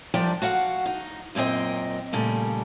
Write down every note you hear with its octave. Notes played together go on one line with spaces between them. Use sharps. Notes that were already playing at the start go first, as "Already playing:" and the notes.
F#2 F3 G3 D4 D5 G5
F#4 F5 F#5
D#4
F#2 A#2 C4 D#5 G5
A#2 C#3 G3 A3